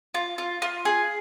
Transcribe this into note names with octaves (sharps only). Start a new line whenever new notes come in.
F4
F4
F4
G#4